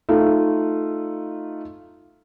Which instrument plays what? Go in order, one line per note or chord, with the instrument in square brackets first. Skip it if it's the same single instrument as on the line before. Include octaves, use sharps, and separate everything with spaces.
[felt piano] A3 D#4 F4